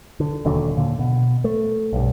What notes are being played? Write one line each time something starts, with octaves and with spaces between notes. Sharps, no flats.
D3
E1 D#2 D3 F#3
A#2 D3
B2
A3
B1 G2